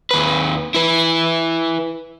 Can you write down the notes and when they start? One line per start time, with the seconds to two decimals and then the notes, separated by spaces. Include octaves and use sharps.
0.11 D#2 B4
0.74 E4 B4